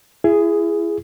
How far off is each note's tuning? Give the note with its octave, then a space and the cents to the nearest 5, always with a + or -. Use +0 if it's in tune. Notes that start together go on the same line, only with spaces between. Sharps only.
E4 +30 G#4 +0